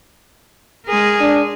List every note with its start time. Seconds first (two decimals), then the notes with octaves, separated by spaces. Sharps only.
0.87 G#3 G#4 A#4
1.21 D4